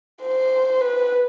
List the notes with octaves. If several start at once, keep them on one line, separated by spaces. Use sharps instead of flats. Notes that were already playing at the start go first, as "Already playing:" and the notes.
C5
B4